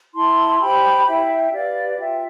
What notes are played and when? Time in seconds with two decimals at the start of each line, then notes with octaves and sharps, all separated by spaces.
0.15 E4 A5 C6
0.60 G4 C5 G5 B5
1.07 E4 E5 G5
1.53 G4 B4 D5 F5
1.90 F5
1.98 F4 E5 G5